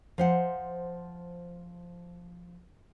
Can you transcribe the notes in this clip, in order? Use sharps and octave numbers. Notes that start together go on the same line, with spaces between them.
F3 C5 F#5